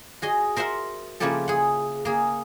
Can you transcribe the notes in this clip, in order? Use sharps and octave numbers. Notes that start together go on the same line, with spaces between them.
F#4 G#4 D#5
A#4 C5 E5 F#5 C6
C#3 F3 A#3 E4 G4 A4
G#4 F#5
A#3 G#4